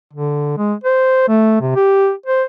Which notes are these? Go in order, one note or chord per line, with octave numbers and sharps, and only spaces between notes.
D3
G#3
C5
A3
C3
G4
C5